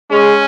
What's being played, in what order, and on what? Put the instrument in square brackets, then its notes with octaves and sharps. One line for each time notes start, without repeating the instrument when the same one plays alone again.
[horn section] G#3 [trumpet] C#4